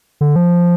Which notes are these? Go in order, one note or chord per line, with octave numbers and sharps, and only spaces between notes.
D3
F3